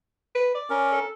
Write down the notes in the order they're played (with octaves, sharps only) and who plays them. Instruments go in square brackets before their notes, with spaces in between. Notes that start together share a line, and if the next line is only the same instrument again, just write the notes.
[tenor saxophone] B4
D5
[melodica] C#4 A#4
[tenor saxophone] A4